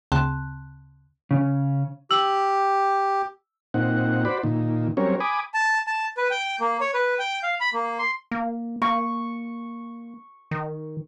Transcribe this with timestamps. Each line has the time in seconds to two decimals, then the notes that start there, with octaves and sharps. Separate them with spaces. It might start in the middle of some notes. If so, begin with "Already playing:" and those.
0.12 D2 C#3 C4 A5 C6 F#6
1.31 C#3 C#4
2.11 G4 E6 F#7
3.74 A#2 C4 D#4 F#5
4.25 F#4 C5 D5 B5
4.43 A#2 D#3
4.97 F#3 G3 C4 C#4 A#4 C#5
5.20 G#5 B5 D6 D#6
5.54 A5
5.87 A5
6.17 B4
6.31 G5
6.60 A#3
6.81 C#5
6.94 B4
7.19 G5
7.43 F5
7.61 B5
7.73 A#3
7.99 C6
8.31 A#3
8.82 A#3 C#6
10.51 D#3